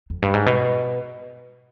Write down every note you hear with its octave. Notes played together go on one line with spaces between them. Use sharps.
F2
G2
G#2
B2